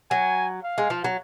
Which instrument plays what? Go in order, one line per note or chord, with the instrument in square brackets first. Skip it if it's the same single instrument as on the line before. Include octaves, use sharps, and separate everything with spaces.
[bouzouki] F#3 [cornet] G#5
[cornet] F5
[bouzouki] G#3
F3
F#3